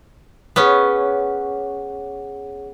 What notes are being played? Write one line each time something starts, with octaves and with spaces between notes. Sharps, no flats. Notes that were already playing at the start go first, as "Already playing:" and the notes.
B3 C#4 G#4 C#5 F#5